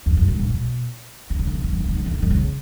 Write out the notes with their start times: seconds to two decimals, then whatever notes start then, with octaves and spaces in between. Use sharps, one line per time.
0.06 E2
0.17 F#2
0.28 G#2
0.39 A#2
0.50 B2
1.30 C#3
1.39 D#3
1.47 C#3
1.55 D#3
1.64 C#3
1.72 D#3
1.80 C#3
1.89 D#3
1.97 C#3
2.06 D#3
2.14 C#3
2.22 D#3
2.30 C#3